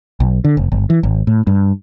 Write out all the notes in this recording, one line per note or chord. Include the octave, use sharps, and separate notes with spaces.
B1
D3
F1
G1
E3
G#1
A2
G2